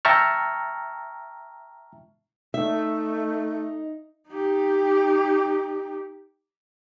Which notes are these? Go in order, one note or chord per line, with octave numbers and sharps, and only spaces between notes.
E5 G5 A5 A#5 C#6 F6
A3 D#4 E5
D#4 G4